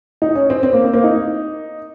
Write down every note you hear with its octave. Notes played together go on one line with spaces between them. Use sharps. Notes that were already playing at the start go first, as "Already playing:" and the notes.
D#4
C#4
C4
C4
A#3
C4
A#3
D#4